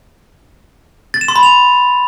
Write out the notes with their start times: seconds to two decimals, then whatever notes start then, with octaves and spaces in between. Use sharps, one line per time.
1.14 A6
1.21 E7
1.28 C6
1.36 B5
1.43 F7